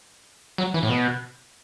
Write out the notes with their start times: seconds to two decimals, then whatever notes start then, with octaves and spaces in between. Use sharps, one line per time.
0.58 F#3
0.74 E3
0.83 A2
0.89 B2